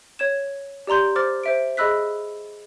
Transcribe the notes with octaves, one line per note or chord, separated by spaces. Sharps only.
C#5 G#6 E7
G4 D5 A#5 C6 G6
C5 D6 F6 A6
C5 E5 D7
G#4 D#5 B5 E6 F#6 B6